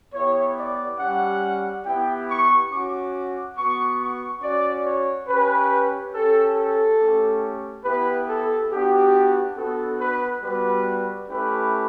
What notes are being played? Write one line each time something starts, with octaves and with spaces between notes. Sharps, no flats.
B3 E4 G4 C#5
D5
G3 C#4 G4 F#5
B3 E4 G4 G5
C#6
C#4 F#4 D6
B3 F#4 C#6
C#6
C#4 F#4 D5
C#5
C#4 G4 B4
C#4 G4 A4
A4
A3 C#4 G4
B3 E4 G4 B4
A4
B3 D4 F#4 G4
B3 D4 F#4 A4
B4
G3 B3 F#4 B4
A3 C#4 E4 G4 B4